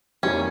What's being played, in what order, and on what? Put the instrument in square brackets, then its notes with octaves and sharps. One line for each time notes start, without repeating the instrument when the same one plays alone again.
[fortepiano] F2 C3 D#3 G3 A#3 [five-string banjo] C#4